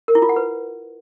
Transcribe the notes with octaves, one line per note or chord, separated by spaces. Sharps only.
A#4
E4
F4
F#5
B4